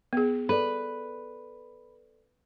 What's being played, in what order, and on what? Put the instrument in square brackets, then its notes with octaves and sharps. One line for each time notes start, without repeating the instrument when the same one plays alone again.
[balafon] B3 G#4
[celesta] A4 D5 [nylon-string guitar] B4